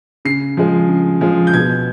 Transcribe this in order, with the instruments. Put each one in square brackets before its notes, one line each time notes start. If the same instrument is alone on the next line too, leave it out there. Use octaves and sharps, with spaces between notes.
[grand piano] C#3 C7
F3 G#3
C#3
F3 G#3
G6
B2 G#6